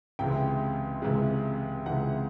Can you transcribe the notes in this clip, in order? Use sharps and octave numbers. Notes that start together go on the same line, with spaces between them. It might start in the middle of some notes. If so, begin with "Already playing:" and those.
C#2 C3 E3 G#3 G5
C#2 C3 E3 G#3
C#2 C3 E3 G#3 F#5